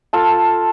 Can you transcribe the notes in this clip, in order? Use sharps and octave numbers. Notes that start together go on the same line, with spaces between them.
F4 A4 A5